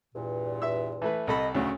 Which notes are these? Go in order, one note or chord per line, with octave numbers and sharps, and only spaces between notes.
E2 G2 A#2
E5 E6
E3 A3 B4
C2 A4 D#5 B5
D2 C#3 F#3 A3